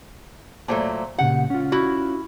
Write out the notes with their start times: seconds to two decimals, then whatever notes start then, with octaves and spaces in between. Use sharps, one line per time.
0.68 A#2 F#3 A3 C5 G5 A5
1.18 A#2 C#3 G4 F#5
1.50 C#4 F4
1.72 E4 F#4